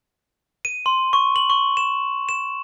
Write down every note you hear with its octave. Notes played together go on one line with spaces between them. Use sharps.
D#7
C6
C#6
F#7
C#6
E7
E7